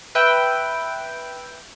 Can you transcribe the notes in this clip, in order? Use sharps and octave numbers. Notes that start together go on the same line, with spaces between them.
B4 E5 G5